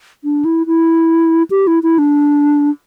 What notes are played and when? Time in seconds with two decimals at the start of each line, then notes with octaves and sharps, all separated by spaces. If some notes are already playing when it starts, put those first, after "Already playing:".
0.24 D4
0.45 E4
0.67 E4
1.51 G4
1.67 E4
1.83 E4
1.99 D4